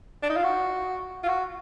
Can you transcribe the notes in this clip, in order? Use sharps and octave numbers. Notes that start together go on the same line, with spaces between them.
D4
D#4
F4
F#4
F4
F#4